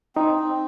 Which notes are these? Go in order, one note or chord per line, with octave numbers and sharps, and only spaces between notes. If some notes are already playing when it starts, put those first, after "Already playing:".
C4 D#4
C4